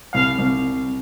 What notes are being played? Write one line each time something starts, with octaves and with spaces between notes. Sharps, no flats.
C2 F5
C2